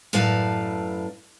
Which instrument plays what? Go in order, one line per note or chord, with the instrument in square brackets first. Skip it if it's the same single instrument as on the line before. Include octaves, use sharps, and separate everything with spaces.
[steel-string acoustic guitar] F#2 A2 B4 D5 F5 A5